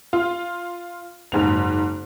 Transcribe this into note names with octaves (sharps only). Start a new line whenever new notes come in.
F4
F#1 G#2 F7